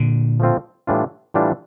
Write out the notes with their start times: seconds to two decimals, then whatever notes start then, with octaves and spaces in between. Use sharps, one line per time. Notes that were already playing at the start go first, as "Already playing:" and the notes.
Already playing: A#2 D3
0.40 F3 A3 C4 F4
0.87 A2 E3 G3 D4 F4
1.34 A2 E3 G3 D4 F4